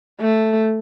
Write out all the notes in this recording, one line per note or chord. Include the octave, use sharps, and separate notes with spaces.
A3